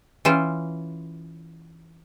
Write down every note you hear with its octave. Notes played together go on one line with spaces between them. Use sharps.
E3 C#4 F4 C5